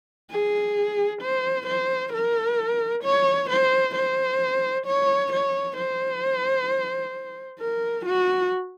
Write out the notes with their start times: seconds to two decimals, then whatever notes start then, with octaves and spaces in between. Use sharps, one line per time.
0.30 G#4
1.22 C5
1.66 C5
2.13 A#4
3.04 C#5
3.50 C5
3.95 C5
4.86 C#5
5.32 C#5
5.77 C5
7.60 A#4
8.06 F#4